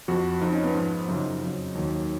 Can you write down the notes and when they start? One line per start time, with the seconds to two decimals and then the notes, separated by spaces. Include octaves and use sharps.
0.08 F2 F3 F#4
0.41 F2 F3 D#4
0.53 C#4
0.63 B3
0.75 G#2 F3
1.08 F#2 C#3 F3 D#4
1.42 F2 C#3 F#3
1.75 D#2 D#3 F#3